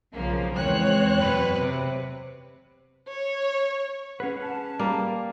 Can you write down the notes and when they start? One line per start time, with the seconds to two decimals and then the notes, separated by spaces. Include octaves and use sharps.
0.14 B1 C#3 F3 A#3
0.54 E2 G#3 C4 C#5 F#6
1.16 F#2 B2 B4
1.56 C3
3.08 C#5
4.20 C#4 G#4 B4 F#5
4.42 A5
4.79 G3 A#3